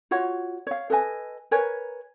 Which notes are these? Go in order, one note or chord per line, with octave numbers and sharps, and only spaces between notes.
F4 F#4 C#5 F#5
C#5 F5
A4 B4 D#5 G#5
A#4 B4 C#5 G#5